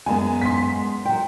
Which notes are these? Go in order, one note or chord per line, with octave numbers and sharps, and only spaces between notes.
F#2 G#3 B3 G#5
C6 B6
F#3 G5